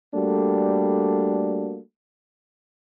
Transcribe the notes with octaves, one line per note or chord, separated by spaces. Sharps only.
G3 A3 A#3 D4 F#4 A4